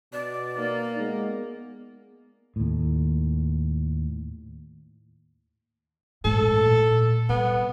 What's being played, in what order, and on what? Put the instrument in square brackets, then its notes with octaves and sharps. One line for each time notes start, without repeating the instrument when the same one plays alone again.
[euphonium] B2 [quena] D5
[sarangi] A#3 [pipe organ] D#4
[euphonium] G#3 [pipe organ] B3
[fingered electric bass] D#2 A2
[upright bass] A#1 G#2 [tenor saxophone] A4
[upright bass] A3
A#2
[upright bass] C3 G3 [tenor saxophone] B3